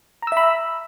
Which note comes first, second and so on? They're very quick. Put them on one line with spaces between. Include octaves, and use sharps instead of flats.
A#5 E6 E5 B5